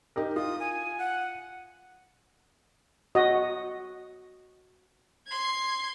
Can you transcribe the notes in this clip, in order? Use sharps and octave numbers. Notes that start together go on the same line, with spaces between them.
D#4 G4 A#4
F4 D#6
G#5
F#5
F#4 D#5
C6 G#6